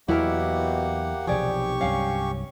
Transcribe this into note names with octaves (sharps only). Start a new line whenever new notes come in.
E2 B2 F#3 A#3 E4 G4 A#4 F#5
B1 C3 F3 G4 G#4 D5 C#6
C2 G2 F#3 C#4 F5